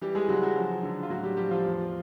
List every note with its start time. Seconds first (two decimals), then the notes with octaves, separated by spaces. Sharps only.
0.01 E3 G3 G4
0.15 G#3 G#4
0.28 C#3 F#3 F#4
0.42 F#3 F#4
0.56 F3
0.83 D3
1.03 F4
1.10 A2 F#3 F#4
1.23 G3 G4
1.37 F3 G3 G4
1.51 F3 F4
1.64 E2